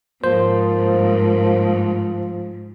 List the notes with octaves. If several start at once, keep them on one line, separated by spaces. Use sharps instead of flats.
G#2 F3 A#3 C5